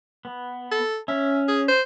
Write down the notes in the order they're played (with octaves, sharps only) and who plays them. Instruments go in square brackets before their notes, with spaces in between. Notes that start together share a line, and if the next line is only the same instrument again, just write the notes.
[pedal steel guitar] B3
[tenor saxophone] A4
[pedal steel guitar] C#4 [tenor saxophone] E5
[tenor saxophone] G#4
C5